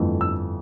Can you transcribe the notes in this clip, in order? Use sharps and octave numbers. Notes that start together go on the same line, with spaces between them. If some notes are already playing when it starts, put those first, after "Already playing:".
Already playing: G1 F2 E3 A3
E6